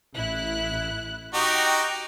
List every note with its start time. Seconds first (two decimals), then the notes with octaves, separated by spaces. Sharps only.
0.14 A1 E4 F#6
1.34 D#4 F#4 G4 G5 D6